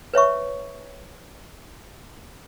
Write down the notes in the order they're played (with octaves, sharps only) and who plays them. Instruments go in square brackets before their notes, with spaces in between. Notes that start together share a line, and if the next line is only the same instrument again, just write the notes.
[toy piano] B4 C#5 E5 C#6